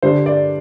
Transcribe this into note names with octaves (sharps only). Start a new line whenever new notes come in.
D3 G3 D4 C5
D5